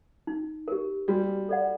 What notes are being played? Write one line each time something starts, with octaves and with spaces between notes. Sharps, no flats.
D#4
G4 A#4
G3 F#4
A4 D5 F#5